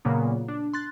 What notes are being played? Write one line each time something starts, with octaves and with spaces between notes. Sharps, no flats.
A#2 C#3 F#3 A#3 B3
D4
C6 F#6 A6